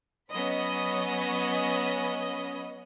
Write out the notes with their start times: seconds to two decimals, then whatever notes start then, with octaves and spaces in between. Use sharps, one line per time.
0.31 F#3 B3 C#4 D#5 B5